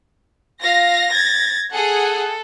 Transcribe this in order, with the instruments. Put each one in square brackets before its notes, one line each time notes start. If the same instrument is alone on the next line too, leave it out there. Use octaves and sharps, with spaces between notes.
[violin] F4 F5 [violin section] A#6
[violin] G#6 A6
[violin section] G#4 F#5 [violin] A4